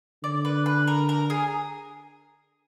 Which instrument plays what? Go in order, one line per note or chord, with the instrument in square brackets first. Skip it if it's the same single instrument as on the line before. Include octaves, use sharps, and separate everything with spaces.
[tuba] D3 [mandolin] D5
[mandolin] B4
B4
A#4
A#4
G#4